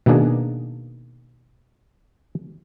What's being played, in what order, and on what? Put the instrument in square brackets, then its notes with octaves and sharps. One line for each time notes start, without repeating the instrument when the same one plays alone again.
[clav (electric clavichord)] B2 D#3 A#3 D4 G#4